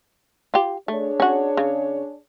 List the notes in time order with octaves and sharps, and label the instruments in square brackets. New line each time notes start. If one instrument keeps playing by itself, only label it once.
[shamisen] F4 G4
[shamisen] A3 [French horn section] D4 G#4 C#5
[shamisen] C#4 F#4
C#3